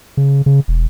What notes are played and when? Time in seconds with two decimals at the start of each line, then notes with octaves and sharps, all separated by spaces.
0.17 C#3
0.46 C#3
0.68 E1